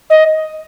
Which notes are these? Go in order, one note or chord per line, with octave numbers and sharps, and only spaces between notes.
D#5